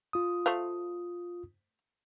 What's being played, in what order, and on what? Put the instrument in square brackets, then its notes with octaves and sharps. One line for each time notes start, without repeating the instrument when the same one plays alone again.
[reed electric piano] F4 D#6
[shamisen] A3 C5 F5